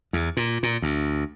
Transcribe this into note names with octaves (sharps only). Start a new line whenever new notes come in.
E2
A#2
A#2
D2